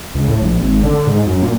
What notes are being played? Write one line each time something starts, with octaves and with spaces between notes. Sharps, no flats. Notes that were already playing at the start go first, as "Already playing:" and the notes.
C#2
A2
A#1
G#1
D3
G#2
F#2
A#2